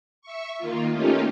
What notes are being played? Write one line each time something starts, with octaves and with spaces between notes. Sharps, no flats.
E5 C#6
D#3 A#3 F4
A3 A#3 C#4 D#4 F4 G4